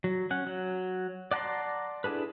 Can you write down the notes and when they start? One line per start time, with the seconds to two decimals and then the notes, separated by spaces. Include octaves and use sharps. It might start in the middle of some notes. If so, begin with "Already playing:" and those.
0.04 F#3
0.31 C#4 F#5
0.47 F#3
1.31 D5 F#5 A5 A#5 C6
2.04 D4 E4 G#4 A4 B4